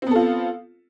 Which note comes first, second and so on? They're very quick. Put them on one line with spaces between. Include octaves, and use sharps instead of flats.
C4 B3 A4 F4